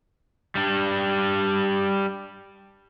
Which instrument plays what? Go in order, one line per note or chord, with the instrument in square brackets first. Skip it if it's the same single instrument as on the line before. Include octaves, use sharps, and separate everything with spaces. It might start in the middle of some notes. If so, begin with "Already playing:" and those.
[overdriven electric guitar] G3 D4